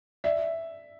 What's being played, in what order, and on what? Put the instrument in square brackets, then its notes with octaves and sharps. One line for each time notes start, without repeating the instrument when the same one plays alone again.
[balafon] D5 [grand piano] E5